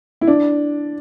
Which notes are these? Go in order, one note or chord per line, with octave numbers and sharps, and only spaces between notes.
E4
D4